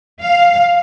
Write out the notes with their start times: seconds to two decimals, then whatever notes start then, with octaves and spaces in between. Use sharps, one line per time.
0.21 F5